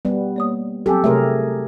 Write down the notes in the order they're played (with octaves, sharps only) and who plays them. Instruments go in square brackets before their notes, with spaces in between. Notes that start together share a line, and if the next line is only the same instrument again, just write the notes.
[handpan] G3 B3
[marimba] A#3 C#5 D#6
[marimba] F#3 C4 G#5 [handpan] G4 A4
[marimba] C3 C#5 E5 [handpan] A3 G#4 A#4